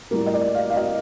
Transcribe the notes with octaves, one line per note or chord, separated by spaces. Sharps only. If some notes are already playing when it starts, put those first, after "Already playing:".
A2 G3 A#3
D#5
D5
F5
F5
D#5